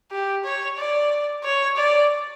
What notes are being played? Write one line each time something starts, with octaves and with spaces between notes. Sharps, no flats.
G4
C#5
D5
C#5
D5